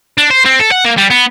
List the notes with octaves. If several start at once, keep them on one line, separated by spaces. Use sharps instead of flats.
D4
C5
C4
A4
F#5
A#3
G3
B3